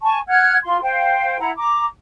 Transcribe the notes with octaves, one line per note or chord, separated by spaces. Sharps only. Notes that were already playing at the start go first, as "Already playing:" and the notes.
G#5 A5 C#6
F#5 F6 F#6 G#6
F4 C6
C5 F5 G5
E4 F#5 A#5
A#5 D6